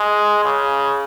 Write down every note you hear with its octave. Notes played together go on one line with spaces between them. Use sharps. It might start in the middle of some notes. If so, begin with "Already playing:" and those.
Already playing: G#3
C#3